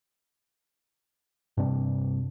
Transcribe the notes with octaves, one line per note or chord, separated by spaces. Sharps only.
G2 C3 D4